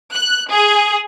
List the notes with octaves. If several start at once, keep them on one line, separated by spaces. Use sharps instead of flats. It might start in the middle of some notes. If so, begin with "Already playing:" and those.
F#6
G#4